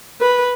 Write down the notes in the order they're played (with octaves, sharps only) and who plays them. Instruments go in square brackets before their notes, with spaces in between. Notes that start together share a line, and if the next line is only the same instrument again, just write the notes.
[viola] B4